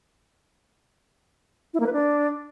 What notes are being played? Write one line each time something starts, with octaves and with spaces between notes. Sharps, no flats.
E4
A#3
B4
D4